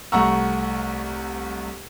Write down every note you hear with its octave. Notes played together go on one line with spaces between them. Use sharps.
C2 A3 F#5 A#5 C#6 E6